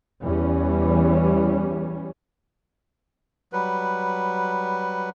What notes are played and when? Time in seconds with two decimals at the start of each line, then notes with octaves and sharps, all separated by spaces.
0.22 E2 E3 G3 C#4
3.53 F#3 G3 B4